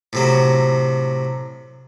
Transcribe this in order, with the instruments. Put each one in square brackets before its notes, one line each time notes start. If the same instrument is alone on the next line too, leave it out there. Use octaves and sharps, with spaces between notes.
[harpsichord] A2 C3 F#3